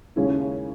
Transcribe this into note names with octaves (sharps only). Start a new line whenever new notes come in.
D#2 C#3 G#3 C#4 E4